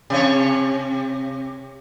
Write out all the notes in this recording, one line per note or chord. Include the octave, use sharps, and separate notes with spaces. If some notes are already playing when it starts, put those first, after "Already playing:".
C3 C#5